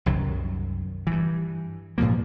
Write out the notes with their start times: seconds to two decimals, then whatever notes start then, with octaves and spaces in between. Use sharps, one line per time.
0.06 C2 F#2 D#3 F#3
1.07 G2 E3
1.98 G2 A#2 F3 A#3